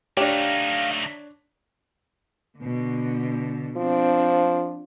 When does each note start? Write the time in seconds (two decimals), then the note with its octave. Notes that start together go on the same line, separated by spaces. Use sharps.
0.17 A3 D4 D#4 G4 C#5 F5
2.58 B2 D3
3.77 F3 C4 D4